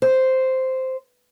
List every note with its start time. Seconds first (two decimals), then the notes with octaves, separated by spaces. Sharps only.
0.02 C5